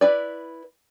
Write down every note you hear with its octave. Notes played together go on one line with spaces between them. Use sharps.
E4 B4 D5